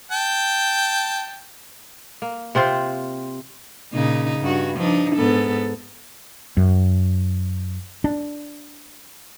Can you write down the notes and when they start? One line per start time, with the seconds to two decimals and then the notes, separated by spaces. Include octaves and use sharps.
0.11 G5 A5
2.22 A#3
2.55 C3 C4 F4 C5
3.93 A#2 C#3 D#4
4.40 G2 F#4
4.75 F3 D4 D#4
5.15 G#2 B3 A4
6.57 F#2
8.04 D4